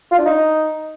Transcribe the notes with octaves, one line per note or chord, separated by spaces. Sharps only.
F4
D4
D#4